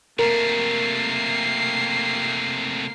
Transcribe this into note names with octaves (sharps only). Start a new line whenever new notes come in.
C3 A3 A#3 A#4 C7